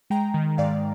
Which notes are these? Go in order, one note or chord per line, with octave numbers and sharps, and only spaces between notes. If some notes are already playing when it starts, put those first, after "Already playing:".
G#3 G5 A#5
D#3
G#2 D5 F5